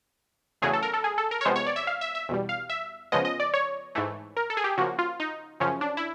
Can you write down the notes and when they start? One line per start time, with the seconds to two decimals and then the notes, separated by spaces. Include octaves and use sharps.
0.62 E2 C#3 F#3 A3 G#4
0.73 A4
0.83 A#4
0.94 A4
1.04 G#4
1.18 A4
1.31 A#4
1.41 C#5
1.45 C3 F3 G#3 B3 C5
1.56 C#5
1.66 D5
1.76 E5
1.87 F5
2.01 E5
2.15 E5
2.29 E2 B2 G3
2.49 F5
2.70 E5
3.12 C#3 F3 G#3 B3 D#5
3.25 D#5
3.40 D5
3.54 C#5
3.95 G#2 E3 A3
4.37 A#4
4.50 A4
4.57 G#4
4.64 G4
4.78 C#3 F3 A#3 F#4
4.99 F4
5.20 D#4
5.60 F#2 C#3 F3 C#4
5.81 D4
5.97 E4